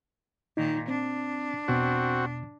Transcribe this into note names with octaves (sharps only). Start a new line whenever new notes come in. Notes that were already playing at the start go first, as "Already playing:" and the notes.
A#2 D#3 D#4
C4 D4
E2 B2 C4 F#4